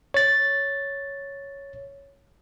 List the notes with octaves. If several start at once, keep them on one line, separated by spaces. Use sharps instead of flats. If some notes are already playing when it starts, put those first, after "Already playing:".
C#5 A6